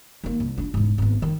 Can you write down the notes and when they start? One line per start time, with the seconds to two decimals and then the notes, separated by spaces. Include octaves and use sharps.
0.24 D#3 A#3
0.40 C2
0.58 D4 F4
0.74 E1 G#2
0.98 G#1 B3
1.22 D#3